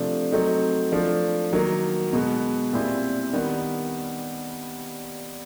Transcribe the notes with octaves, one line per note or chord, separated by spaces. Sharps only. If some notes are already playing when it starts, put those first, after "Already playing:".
Already playing: C3 F3 A3 D4
F#3 A3 C4 D#4
F3 A3 D4
D#3 F#3 A#3
B2 G#3 B3
A#2 G3 C4 E4
D#3 G3 B3